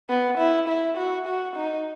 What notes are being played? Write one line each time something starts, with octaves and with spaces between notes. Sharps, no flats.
B3
E4
E4
F#4
F#4
D#4